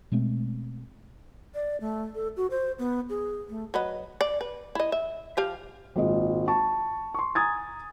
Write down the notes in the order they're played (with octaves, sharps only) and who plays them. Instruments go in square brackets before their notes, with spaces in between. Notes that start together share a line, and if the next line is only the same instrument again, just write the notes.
[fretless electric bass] B2 G#3 A3 C4
[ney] D5
A3
A4
F#4
C5
B3
G#4
A3
[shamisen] F#3 B4 D#5
D5
B4
E4 D#5
E5
F3 G4 F5
[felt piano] G#1 A#2 G#3 D#5
A5 C#6
C6 C#6
G#5 A#5 D#6 G#6 A6